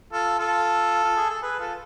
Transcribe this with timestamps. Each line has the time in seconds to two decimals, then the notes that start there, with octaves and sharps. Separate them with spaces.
0.13 F4 A4
0.39 F4 A4
1.04 F4
1.17 G#4
1.30 A4
1.42 G#4 B4
1.60 F4 A4